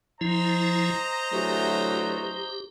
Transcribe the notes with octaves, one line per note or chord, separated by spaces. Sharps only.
F3 E4 C5 D#5 A#5
D2 E3 F#3 A3 G4